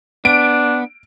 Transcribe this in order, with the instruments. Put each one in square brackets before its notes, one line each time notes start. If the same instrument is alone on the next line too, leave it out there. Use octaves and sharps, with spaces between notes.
[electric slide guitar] B3 [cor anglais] D4 [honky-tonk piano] D7